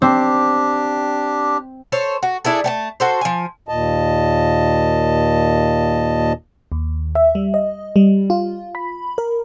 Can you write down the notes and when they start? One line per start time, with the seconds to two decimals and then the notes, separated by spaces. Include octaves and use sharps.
0.02 C4 D4 G4
1.92 A4 C5 C#5
2.23 F#4
2.45 D4 E4 G#4 A4
2.64 A3 G5 A5
3.00 F#4 A4 C5
3.21 F3 G#5
3.69 D#2 A#2 D#5 A5
6.72 D#2
7.15 E5
7.35 G3
7.54 D#5
7.96 G3
8.30 F4
8.75 B5
9.18 A#4